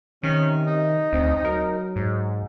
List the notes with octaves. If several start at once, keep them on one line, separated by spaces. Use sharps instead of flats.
C3 D#3 C#4
D#4
D2 C4
F#3 A#4
G#2